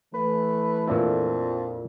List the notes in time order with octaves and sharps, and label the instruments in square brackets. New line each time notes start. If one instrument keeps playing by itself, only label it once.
[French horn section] E3 A3 [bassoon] B4
[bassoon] F2 [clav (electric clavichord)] A#2 D4 E4